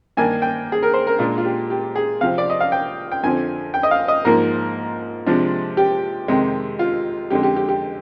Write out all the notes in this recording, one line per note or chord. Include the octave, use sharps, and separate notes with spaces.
G2 D#3 A#3 D4 G#5
G5
G#4
A#4
C5
A#4
A#2 G#3 D4 F4
F4
G4
G4
G#4
C3 F3 C4 F5
D5
D#5
F5
G5
G5
F2 D3 F3 C4 G#5
G5
D#5
F5
D#5
G#2 F3 A#3 A#4
C3 F3 G#3 D4
G4
F2 C3 D#3 G#3
F4
F2 D3 G#3 G4
G4
G4
G4